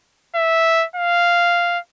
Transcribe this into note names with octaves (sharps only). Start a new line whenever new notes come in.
E5
F5